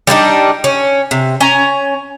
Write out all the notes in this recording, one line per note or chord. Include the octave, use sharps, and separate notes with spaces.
G3 B3 D4 D#4
C#4
C3
C#4 G#5 A#5